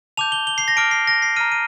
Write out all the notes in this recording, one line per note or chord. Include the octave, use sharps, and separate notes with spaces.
A5 D6 G6 F7
G7
G7
C7
A#6
A5 D6 F6 D7
C7
A#6
C7
A#5 F6 D#7
D#7